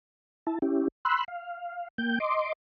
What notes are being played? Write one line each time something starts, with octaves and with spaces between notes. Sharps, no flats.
E4 A5
C#4 E4 G4
B5 C6 E6 F#6
F5
A#3 G5 G6
D#5 C6 D6